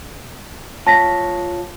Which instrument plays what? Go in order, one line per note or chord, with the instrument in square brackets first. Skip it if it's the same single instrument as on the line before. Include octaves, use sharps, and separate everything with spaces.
[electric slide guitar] F4 C#5 [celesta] A5 A#6 B6